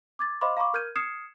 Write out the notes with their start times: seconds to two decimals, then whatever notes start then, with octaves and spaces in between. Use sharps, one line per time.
0.19 D6 G#6 A6
0.41 C5 D#5 F5 B5 C6 D6
0.57 F5 A#5 B5 C#6 D6
0.74 A#4 F6 G6 G#6 D#7
0.96 D#6 F6 G#6 C7 C#7 E7